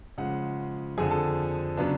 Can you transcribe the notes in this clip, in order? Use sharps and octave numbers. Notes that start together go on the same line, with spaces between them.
C#3 F3 G#3 F#5
F2 D3 F3 G#4 G#5
A4 A5
C#3 F#3 B3 D4